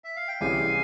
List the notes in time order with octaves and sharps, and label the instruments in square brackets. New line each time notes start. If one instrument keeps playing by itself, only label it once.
[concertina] E5
F5
G5
[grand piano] C2 C3 E3 G#3 C#4 [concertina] F5 G#5